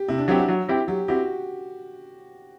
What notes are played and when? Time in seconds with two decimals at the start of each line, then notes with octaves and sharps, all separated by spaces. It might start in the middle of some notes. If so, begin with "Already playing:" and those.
Already playing: G4
0.08 C3 E4
0.18 D4
0.28 F#3 C4 E4 G4
0.39 F#4
0.48 F#3
0.68 C4 E4 G4
0.88 F#3 G4
1.08 C4 E4 F#4 G4